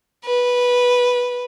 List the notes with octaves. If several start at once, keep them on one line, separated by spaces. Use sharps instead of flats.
B4